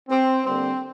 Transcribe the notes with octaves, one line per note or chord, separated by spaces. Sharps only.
C4
D3 G3 A#3 C4